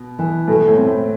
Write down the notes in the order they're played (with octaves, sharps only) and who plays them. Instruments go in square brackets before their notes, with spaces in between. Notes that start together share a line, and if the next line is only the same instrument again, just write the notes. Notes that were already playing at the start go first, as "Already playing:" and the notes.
Already playing: [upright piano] B2
[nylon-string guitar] E3
[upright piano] B2 [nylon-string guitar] A3
[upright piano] A2
[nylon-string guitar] C4
[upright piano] A2